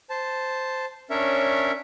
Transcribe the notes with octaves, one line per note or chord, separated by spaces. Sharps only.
C5 A5
C#4 D4 A#4 C#5 E5